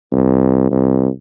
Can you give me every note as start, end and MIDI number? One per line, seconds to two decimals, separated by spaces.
0.12 0.69 36
0.71 1.08 36